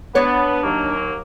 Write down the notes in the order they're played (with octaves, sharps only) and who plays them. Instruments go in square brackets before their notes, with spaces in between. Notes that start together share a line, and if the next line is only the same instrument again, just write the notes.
[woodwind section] B3 [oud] D4 C#5
[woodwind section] D#2 F#3 A#3